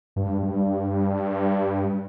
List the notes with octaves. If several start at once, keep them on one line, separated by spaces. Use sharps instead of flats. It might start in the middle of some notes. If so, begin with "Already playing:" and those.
G2
G2